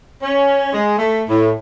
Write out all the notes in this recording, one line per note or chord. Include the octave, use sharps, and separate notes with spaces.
C#4
G#3
A3
A2